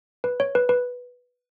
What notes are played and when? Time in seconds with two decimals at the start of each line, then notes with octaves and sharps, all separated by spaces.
0.24 B4
0.40 C#5
0.55 B4
0.69 B4